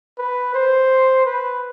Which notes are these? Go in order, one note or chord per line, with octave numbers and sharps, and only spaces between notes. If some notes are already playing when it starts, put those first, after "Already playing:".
B4
C5
B4